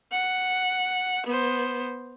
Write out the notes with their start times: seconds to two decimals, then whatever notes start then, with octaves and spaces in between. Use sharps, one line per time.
0.12 F#5
1.26 B3 C5